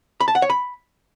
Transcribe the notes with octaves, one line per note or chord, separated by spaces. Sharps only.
B5
A5
F#5
C#5
B5